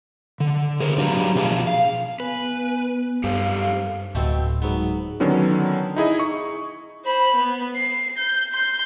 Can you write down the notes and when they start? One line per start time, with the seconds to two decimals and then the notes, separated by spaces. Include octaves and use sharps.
0.40 D3
0.80 G#4 A#4 C5
0.98 F#3 D4 G4 B4 F5 A#5
1.35 B2 F3 G#4 B4 F5 A5
1.67 F5
2.20 B3 B4 G#5
3.24 G2 G4 A4 C5 F5
4.15 D1 B2 A3 C4
4.62 G#2 F#3 B3
5.20 D3 D#3 F#3 B3 C#4
5.96 D#4 E4 G#4 D#5
6.19 C#6
7.05 C5 B5
7.35 B3
7.76 C7
8.18 G6
8.52 C6 G6